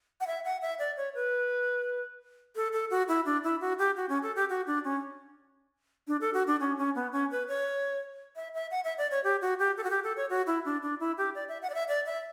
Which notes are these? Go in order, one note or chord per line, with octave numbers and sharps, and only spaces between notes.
F#5
E5
F#5
E5
D5
C#5
B4
A4
A4
F#4
E4
D4
E4
F#4
G4
F#4
C#4
A4
G4
F#4
D4
C#4
D4
A4
F#4
D4
C#4
C#4
B3
C#4
B4
C#5
E5
E5
F#5
E5
D5
C#5
G4
F#4
G4
A4
F#4
G4
A4
C#5
F#4
E4
D4
D4
E4
G4
D5
E5
F#5
D5
E5
D5
E5